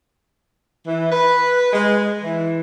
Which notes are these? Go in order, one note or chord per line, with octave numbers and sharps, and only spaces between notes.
E3
B4
G#3
E3